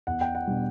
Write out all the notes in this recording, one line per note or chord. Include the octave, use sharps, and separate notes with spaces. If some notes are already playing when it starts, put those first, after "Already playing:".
E2 F#5
G5
F#5
B2 G3 D4